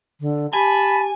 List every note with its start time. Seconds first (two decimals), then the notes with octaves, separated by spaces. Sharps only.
0.21 D3
0.53 G4 G#5 A5 B5